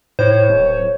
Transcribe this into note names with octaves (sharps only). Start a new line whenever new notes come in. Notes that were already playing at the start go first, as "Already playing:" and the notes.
A2 C5 C#5
D1